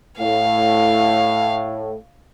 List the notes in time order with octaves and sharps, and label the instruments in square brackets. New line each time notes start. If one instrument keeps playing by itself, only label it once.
[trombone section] A2 [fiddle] F5